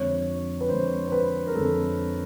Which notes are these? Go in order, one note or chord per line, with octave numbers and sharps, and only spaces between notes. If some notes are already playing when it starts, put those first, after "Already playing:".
Already playing: F2 D3 F3 G#3 C#5
B4
F2 D3 F3 G#3 C5
C5
B4
A#4
F2 D3 F3 G#3 A4